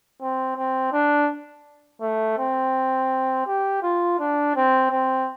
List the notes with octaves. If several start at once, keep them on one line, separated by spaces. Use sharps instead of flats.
C4
C4
D4
A3
C4
G4
F4
D4
C4
C4